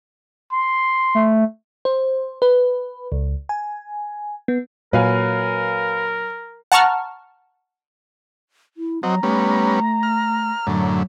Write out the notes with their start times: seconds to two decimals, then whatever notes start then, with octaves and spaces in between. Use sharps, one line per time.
0.52 C6
1.15 A3
1.85 C5
2.42 B4
3.12 C#2
3.49 G#5
4.48 B3
4.93 A#2 F#3 A#4 B4 F5 G#5
6.72 F#5 A5 A#5 C#6 F6
8.77 E4
9.03 F#3 C4 F#4 D#5 A#5
9.23 G3 A3 B3 C#4
10.03 F6
10.67 F#2 A2 D3 F#3